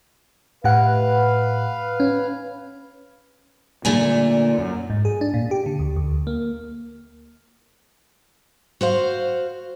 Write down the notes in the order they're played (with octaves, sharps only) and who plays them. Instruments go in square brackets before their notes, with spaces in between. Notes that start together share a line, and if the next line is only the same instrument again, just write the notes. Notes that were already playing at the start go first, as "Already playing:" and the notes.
[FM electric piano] A2 G4 F#5 [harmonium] B4 F5
[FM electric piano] C#4
[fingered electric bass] A#2 A#3 [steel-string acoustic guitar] D3 A3 G#5
[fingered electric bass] F#2
[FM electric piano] G#2
G#4
D4
A#2
G4
D3
D2
D2
A#3
[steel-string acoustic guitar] F#4 C5 F5